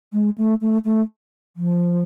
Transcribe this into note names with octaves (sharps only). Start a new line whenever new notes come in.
G#3
A3
A3
A3
F3